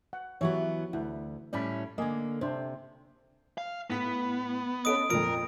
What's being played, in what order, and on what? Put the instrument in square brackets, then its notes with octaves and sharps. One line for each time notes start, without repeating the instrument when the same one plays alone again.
[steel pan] F#5
[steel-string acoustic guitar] E3 F#3 B3 [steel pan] F#4 G4 C#5
[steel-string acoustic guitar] D2 [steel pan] E4 F#5
[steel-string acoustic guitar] A2 G3 C#4 [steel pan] D5 B5
[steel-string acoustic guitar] D3 A#3 [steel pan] D#5 G#5
[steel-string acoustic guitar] C3 [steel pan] D4 C5
[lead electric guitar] F5
[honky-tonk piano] A2 B6 [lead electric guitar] B3
[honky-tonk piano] C#4 A4 D#5 [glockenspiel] D#6 D7
[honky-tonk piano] F2 A#2 F3 [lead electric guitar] A#4 [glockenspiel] D7